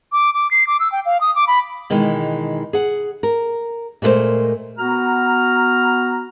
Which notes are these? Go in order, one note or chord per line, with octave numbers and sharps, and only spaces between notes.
D6
D6
C7
D6
E6
G5
F5
D#6
D6
B5
B2 D#3 E3 G#3
G#4 F#5
A#4
A#2 G#3 A3 F#4 A#4 C5
B3 F#4 A#5 F6